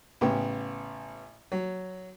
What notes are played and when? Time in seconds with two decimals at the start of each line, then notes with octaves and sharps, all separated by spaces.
0.21 A1 C#3 B3 G5
1.52 F#3